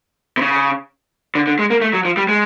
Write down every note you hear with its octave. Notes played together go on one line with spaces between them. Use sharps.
C3
C#3
D3
D3
G#3
A#3
A3
F#3
F3
G3
G#3